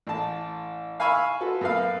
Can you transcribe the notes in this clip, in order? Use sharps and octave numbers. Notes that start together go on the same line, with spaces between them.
A1 A5
F5 G#5 B5 C#6 E6 F6
F4 F#4 A4 B4
F#2 B3 F5